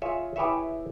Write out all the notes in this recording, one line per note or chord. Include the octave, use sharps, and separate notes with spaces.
F4 G#4 C#5 E5
E4 G4 G#4 B4 C#5 E5